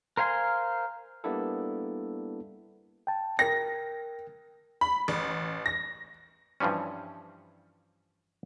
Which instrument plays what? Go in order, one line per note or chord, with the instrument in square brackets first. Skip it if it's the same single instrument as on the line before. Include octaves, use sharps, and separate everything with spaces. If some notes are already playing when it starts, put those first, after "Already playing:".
[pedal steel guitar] A#4 C5 F5 G#5 C6
[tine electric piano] G3 A#3 B3 D4 E4 A4
[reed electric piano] G5 A5
[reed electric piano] A#4 G5 [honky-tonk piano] A#6
[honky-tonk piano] B5
A1
A#6
[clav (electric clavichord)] G2 E3 F3 G3 C#4